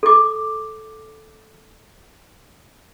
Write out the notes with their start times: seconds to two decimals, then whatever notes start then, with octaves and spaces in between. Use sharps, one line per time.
0.03 A4 D6